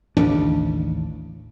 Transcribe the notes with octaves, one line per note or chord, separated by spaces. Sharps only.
A1 D#2 C#3 D4